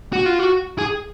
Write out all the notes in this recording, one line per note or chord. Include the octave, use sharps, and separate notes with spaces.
F#4
F4
F#4
G#4